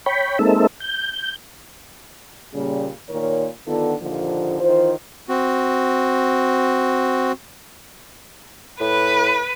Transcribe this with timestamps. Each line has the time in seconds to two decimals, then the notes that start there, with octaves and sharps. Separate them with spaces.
0.06 C#5 G5 B5
0.39 G#3 A#3 C4 D#4 A4 E5
0.80 G6
2.54 A#2 C#3 G3
3.09 A#2 D#3 A#4 C#5
3.68 D3 D#3 B3 D4 F4 A4
4.01 D#2 A#2 D3 F3
4.61 D#3 E3 F4 C5
5.28 C4 F#4
8.80 A2 B4